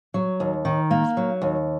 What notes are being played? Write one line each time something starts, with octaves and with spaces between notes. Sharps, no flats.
F#3
D#2
D#3
A#3
F#3
D#2